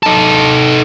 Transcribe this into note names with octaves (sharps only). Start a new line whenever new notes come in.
D#4 A4